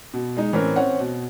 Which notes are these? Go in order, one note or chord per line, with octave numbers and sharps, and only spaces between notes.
B2
G#3 D#4
A2 E3 C4 C#4 A#4
C4 C#4 C#5 F#5
B2